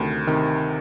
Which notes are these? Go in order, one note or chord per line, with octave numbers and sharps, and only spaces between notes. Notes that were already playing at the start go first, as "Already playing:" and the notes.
Already playing: D2 C3 D#3
C3 D#3